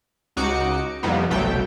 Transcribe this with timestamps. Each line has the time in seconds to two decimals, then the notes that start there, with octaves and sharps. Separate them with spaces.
0.37 C#2 D#4 F#4 D6 C#7
1.03 F2 C3 G3 A#3 B3 D#4
1.30 G1 C2 B2 F#3 A3 G5